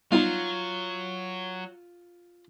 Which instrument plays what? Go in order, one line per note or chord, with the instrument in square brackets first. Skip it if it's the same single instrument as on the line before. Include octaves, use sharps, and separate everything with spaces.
[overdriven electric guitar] F#3 [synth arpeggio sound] G3 B3 D#4 [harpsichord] F4